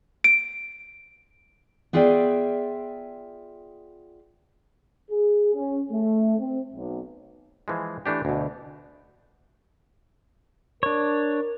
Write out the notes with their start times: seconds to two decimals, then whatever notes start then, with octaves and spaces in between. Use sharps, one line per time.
0.24 D7
1.93 B3 F4 G#4 D5 E5 G5
5.11 G#4
5.54 C#4
5.91 A3
6.39 C4
6.75 B1
7.68 E3 F3 G#3
8.06 E3 A3 D4 G4
8.25 D2 B2
10.83 D4 A#4 C#5